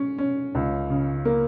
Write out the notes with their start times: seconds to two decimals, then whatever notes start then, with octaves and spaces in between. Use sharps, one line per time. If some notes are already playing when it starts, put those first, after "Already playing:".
Already playing: C#4
0.18 C#4
0.55 C#2
0.90 C#3
1.25 A#3